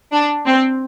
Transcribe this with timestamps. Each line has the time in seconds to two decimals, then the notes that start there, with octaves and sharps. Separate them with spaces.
0.12 D4
0.46 C4